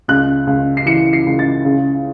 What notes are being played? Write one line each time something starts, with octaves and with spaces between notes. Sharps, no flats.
C#2 F#6
C#2
C7
E3 C#7
C7
C#2
A6
C#3